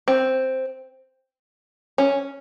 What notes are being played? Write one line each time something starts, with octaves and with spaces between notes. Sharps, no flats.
C4
C#4